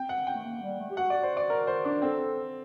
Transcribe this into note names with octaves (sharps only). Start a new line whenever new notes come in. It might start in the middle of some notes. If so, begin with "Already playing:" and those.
Already playing: C4 G5
F#5
G5
A3
A#3
G3
A3
G4
F#4 F#5
D5
C5
D5
A#4
C5
D4
C4 A4